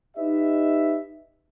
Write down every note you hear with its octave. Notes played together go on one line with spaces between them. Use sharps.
D#4 G4 B4 D#5 E5